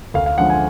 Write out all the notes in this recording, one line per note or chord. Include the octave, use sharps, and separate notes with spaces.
D2 F5
F5
D3 F3 G#3 F#5
G#5